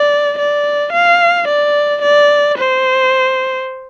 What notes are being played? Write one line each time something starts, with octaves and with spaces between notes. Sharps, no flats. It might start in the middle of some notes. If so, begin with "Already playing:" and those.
Already playing: D5
D5
F5
D5
D5
C5